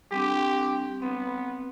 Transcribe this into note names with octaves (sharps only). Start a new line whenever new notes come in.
G3 C4 D4 G4
B3 C4